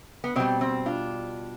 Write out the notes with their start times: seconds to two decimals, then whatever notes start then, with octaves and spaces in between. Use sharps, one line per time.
0.24 B3
0.36 B2 G3 C4
0.61 C4
0.86 D4 F4